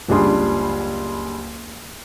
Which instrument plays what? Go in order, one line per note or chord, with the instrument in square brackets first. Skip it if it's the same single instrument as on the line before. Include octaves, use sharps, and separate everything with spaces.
[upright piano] F#1 C#2 G3 D4 G#4 C6